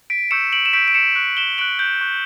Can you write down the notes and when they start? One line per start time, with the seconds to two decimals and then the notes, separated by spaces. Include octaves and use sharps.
0.10 B6 D7
0.31 C#6 E6 G6 C#7 E7
0.53 D7 F#7
0.66 E7
0.73 C#6 E6 G6 B6 D7
0.88 D7
0.94 C#7 E7
1.15 C#6 F#6
1.37 E7 G7
1.58 C#6 F#6 D7 F#7
1.79 G6
2.01 C#6 F#6